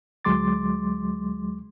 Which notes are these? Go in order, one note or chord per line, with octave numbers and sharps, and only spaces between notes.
D2 F#3 G#3 C6 D6 A6